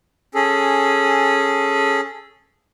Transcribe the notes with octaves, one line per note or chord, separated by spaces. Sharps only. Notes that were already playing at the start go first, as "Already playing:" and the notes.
C#4 G#4 A4